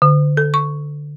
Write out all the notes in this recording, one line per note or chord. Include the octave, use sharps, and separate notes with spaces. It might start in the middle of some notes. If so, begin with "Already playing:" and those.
D3
A4
C#6